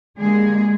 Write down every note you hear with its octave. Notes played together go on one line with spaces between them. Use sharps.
D3 G3 G#3 A#3 G#4